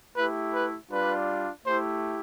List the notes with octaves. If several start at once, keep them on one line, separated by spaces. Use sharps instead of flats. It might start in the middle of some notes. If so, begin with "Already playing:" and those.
A3 E4 G4 B4
B4
G3 D4 F4 B4
A3 E4 G4 C5